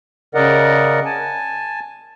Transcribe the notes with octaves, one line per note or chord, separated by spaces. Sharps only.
C#3 A#4 D5 D#5 F#5
G#5 A5